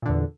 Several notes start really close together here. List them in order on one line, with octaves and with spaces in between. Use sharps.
A#2 D3 E2